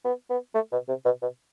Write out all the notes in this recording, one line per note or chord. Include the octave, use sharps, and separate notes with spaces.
B3
B3
A3
B2
C3
B2
B2